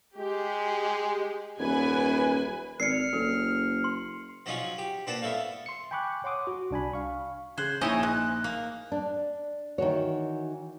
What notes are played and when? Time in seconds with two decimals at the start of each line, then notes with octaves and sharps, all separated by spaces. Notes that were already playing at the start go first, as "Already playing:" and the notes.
0.17 G#3 G4
1.59 D#1 F#2 B4 G#5
2.80 G#1 A#4 D5 F6 C7 C#7
3.13 F#1 A4
3.84 C6
4.46 F3 F#3 C#4 D#4 F4 G#4
4.78 G4
5.07 A#2 D4 B4 C5 F#5 A5
5.22 B3 E4 A4 C#5 F5
5.66 C6 C#7
5.91 G5 G#5 B5 C#6 D6 F#6
6.24 C#5 F#5 C6 D6 D#6
6.47 F#4
6.71 C2 D4 G#5 B5
6.93 F5 C#6
7.58 C#3 C5 F#6 G#6
7.81 A#1 C#4 D#4 E4 D#5 G#5 C#6 E7
8.03 G#3 F#6
8.44 A#3
8.92 D4
9.78 D#3 E3 F#4 C#5